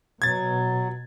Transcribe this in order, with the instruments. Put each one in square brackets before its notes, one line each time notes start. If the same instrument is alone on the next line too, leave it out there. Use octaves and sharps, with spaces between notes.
[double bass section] B2 [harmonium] F#3 [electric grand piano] G#6 A6